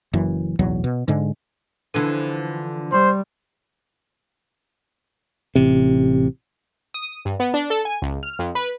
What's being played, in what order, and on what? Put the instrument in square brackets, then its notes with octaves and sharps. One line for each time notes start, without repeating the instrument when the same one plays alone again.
[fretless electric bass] F#1 F#2 E3
D1 B1 E2 F#3
B2
G#2 D3 G#3
[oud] D3 E3 F3 [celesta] D4 A4 D#7
[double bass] G3 [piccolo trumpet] C5 [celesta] C6 C#6
[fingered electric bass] A1 C3
[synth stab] D#6
G2
B3
D4
A4
G#5
C#2
F6
F2
B4